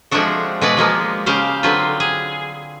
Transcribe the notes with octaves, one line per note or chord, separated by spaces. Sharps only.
F3 G#3 A3 C4 D4 F#4
B2 G#3 B4 D5
F3 G#3 A#3 B3
C#3 G4 C5 F5
D3 F#3 C4 F4 B4
G#4